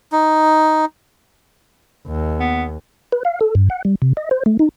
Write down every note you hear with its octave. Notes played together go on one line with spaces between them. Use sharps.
D#4
D#2
B3
B4
F5
A4
G2
F#5
G3
C3
D#5
C5
A3
D#4